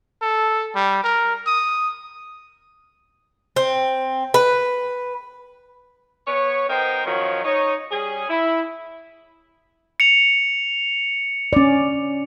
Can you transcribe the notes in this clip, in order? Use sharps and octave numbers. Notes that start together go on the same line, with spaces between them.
A4
G3
A#4
D#6
C4
B4
B3 C#5
B3 D#4 A#4 C5 G5
F#2 D#3 F3 F#3 C#5
D#4 C#5
G3 C#4 G#4
E4
C#7 F7
C#4 D5